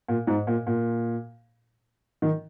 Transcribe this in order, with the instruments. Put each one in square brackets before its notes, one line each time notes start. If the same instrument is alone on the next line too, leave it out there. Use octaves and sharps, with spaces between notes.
[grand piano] A#2
G#2
A#2
A#2
D#3